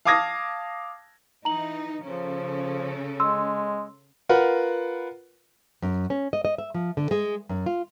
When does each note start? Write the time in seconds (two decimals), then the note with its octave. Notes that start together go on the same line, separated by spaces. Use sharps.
0.05 F5 A5 D6 D#6 G#6 A#6
1.45 E3 D#4 A#5 F#7
2.04 C#3 F3 C#4 A4
3.20 G#3 C6 E6
4.29 F4 A#4 B4 F#5
5.82 F#2
6.10 C#4
6.33 D#5
6.45 D#5
6.58 E5
6.74 F3
6.97 D3
7.11 G#3
7.49 F#2
7.66 F4